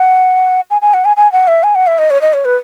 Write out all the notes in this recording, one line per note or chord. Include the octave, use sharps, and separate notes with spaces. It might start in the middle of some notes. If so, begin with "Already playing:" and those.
Already playing: F#5
G#5
G#5
F#5
G#5
G#5
F#5
E5
G#5
F#5
E5
D#5
C#5
D#5
C#5
B4